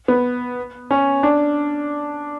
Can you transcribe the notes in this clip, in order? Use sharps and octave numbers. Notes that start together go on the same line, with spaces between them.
B3
C#4
D4